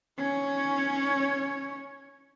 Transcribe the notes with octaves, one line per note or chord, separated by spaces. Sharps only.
C#4 C#5